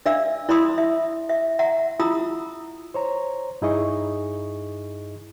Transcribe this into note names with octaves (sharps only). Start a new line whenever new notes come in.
D4 D5 E5 F5 E6
E4 D5 B5 C6 D#6 E6
E5
E5
E5 F#5 A#5
E4 F4 A#5 B5 D#6 E6
C5 C#5 A#5
G2 D#4 E4 G#4 D#5 C#6